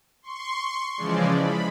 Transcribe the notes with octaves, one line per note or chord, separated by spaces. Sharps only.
C6 C#6
C#3 E3 F3 G#3 D5
B5